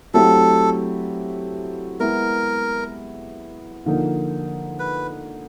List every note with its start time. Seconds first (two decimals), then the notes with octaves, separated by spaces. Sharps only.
0.14 F#3 A3 C4 E4 G4 A4
2.00 G#3 B3 E4 A#4
3.86 D3 F3 A#3 D#4
4.79 B4